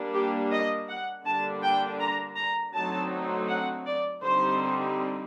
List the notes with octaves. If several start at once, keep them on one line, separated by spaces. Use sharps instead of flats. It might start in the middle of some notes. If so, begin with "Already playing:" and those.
Already playing: G3 A#3 D4
G4
D#5
F#5
D3 G3 A#3 D4 A5
G5
A#5
A#5
D3 F#3 A3 C4 D#4 A5
F#5
D5
D3 G3 C4 D#4 C5